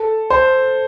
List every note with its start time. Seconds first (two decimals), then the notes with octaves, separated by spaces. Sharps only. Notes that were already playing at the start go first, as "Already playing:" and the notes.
Already playing: A4
0.30 C5